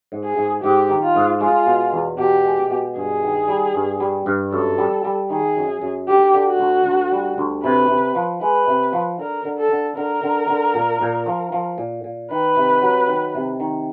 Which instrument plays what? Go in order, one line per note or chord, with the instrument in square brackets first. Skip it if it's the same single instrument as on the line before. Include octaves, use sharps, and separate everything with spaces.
[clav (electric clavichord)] G#2
[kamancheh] G#4
[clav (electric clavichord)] G#2
[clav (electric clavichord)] G#2 [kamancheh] G4
[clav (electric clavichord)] D#3
[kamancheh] F4
[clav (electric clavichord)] G#2
[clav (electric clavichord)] G#3 [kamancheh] F4
[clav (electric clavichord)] B2
E2
[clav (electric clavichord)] B2 [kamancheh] G4
[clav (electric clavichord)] G#3
B2
[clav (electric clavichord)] G2 [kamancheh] G#4
[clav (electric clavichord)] D#3
G3
G2
G3
G2
[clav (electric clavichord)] F#2 [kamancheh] A4
[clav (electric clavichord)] G3
G3
[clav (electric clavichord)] D#3 [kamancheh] G#4
[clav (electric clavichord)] F#2
F#2
[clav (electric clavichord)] D2 [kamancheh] G4
[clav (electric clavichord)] D3
[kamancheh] F#4
[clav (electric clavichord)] D2
D2
G3
D2
[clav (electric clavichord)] C3 [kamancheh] B4
[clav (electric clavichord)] C3
F3
[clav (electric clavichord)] G#3 [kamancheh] B4
[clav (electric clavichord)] C3
F3
[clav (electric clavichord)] D3 [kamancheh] A#4
[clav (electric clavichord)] D3
[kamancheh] A4
[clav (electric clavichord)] D3
[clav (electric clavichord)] D3 [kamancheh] A#4
[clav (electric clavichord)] D3
D3
A#2
A#2
F3
F3
A#2
A#2
[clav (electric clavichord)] D#3 [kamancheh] B4
[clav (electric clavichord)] C3
F#3
D#3
C3
D#3